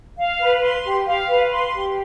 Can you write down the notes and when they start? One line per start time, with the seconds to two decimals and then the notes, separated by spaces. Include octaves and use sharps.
0.18 F5
0.40 B4
0.63 C6
0.85 G4
1.07 F5
1.29 B4
1.51 C6
1.73 G4